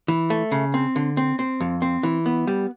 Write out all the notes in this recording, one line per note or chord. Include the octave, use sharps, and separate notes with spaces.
E3
A3
C#3
C4
D3
C4
C4
F2
C4
E3
B3
G3